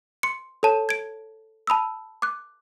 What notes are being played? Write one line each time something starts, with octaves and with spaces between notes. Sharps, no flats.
C6 C#7
A4 C#5 A5 E7
G#6 D7
A5 B5 D#6 E6
D6 F#6